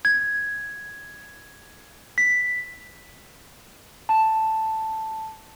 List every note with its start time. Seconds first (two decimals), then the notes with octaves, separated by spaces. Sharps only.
0.05 G#6
2.18 B6
4.09 A5